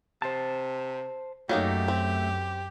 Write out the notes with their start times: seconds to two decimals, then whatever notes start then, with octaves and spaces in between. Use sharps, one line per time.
0.22 C3 C5 A5
1.49 F#2 F#3 A3 A#3 D#4 G4
1.88 C4